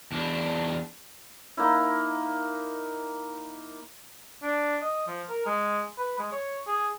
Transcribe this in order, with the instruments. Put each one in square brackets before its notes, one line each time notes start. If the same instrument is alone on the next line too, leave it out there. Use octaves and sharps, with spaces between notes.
[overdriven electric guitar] E2 D4
[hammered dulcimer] A#3 D#4 E4
[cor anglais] D4
D#5
F3
A#4
G#3
B4
G#3
C#5
G#4